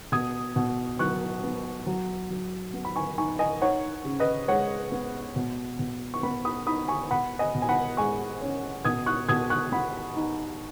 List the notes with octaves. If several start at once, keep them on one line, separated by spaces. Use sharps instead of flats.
B2 D#6 G#6
B2
F#3 C#6 F#6
B3
F#3
F#3
B3
B5
G#5 C#6
D#4 G#5 C#6
D#5 G#5
D#4 C#5 F#5
C#3
B4 D#5
G#3 C#5 F#5
B3
B2
B2
C#6
B3 F#5 B5
B5 D#6
D#4 B5 D#6
G#5 C#6
B2 F#5 B5
D#5 G#5
B2
G#5
F#5 B5
G#3 G#5 C#6
C#4
B2 D#6 G#6
C#6 F#6
B2 D#6 G#6
C#6 F#6
B3 F#5 B5
D#4